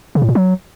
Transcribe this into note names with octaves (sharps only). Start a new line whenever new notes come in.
C#3
A2
A#2
F#3